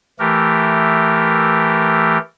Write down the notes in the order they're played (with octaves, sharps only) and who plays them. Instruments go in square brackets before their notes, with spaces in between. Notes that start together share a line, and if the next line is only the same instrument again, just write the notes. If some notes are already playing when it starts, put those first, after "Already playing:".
[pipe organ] E3 A3 G4 A#4